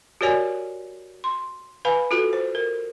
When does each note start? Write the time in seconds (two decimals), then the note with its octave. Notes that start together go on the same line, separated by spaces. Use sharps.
0.21 F#4 G4 A#4 C#5 D5 G#5
1.24 C6
1.85 B4 F5 G#5 B5
2.11 F4 F#4 A4
2.33 C5
2.55 A#4